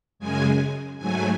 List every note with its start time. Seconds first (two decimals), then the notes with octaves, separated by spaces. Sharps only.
0.19 F#2 C#3 G#3 G#5
0.99 G#2 F#3 A3 G#5